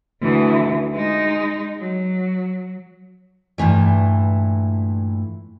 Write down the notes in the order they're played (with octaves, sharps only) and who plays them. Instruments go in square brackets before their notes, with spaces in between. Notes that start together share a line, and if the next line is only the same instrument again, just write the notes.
[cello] D2 E3
G#3 D#4
F#3
[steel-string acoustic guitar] G2 A#2 E3 A3